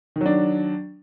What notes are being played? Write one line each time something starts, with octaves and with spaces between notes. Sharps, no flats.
D#3 F#3 D4